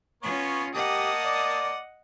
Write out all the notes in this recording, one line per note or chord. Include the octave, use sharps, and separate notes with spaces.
B3 C#4 F4 C#5
A#3 G4 D#5 F#5 A5 D#6
D5